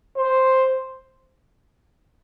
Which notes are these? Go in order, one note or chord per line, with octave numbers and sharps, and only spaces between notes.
C5